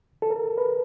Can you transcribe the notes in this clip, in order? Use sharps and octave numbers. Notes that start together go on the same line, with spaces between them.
A4
A#4
B4